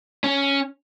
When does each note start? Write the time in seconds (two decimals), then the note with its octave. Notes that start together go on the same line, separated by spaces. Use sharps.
0.24 C#4